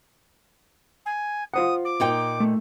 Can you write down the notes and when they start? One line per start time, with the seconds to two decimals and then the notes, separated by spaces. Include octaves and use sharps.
1.05 G#5
1.54 F4 C5 F#5 D#6
1.84 D6
2.00 A#2 D#4 G5
2.40 A3